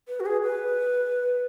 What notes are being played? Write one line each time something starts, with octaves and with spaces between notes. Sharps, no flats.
B4
F#4
G#4
B4